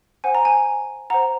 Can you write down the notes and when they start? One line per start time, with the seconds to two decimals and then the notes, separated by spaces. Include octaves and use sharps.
0.24 C5 F#5 G#5
0.35 A#5
0.45 G#5
1.10 C5 F#5 A#5